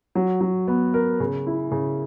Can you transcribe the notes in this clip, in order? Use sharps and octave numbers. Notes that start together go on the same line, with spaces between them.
F#3
F#3
B3
A#4
C#3
E4
C#3